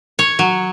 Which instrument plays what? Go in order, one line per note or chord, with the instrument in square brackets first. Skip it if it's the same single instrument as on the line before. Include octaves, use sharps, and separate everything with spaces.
[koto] C#5
F#3